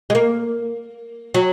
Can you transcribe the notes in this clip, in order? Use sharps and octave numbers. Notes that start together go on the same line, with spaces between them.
G#3
A#3
F#3